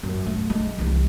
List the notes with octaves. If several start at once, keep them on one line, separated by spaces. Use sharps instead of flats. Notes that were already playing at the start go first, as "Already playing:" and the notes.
F#2
B1 A3
G#3
C2 E3